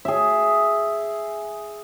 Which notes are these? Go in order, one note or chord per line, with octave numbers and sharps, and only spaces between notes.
G#4 E5